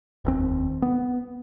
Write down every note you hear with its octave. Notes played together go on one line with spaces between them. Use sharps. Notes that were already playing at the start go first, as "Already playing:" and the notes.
F1 D#2 C4
B3